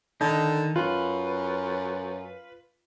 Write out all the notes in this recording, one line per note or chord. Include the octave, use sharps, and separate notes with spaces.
D3 D#3 D#4
F#2 F4 B4